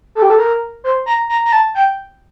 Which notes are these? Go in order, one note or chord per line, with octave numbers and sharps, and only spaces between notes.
A4
G4
A4
A#4
C5
A#5
A#5
A#5
A5
G5